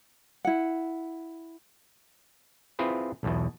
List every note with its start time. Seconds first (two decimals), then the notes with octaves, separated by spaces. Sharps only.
0.45 E4 F#5
2.79 C4 E4 F4 G#4 B4
3.23 B1 E2 B2